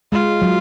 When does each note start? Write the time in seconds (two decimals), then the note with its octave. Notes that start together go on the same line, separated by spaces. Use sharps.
0.12 G#3 F4
0.42 F#3